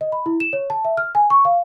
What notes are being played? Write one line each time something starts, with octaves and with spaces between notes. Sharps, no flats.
D#5
B5
E4
E7
C#5
A5
E5
F6
G#5
C#6
F5